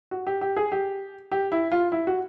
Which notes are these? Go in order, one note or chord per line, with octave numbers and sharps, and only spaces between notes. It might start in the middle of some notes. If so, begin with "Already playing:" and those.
F#4
G4
G4
G#4
G4
G4
E4
F4
E4
F#4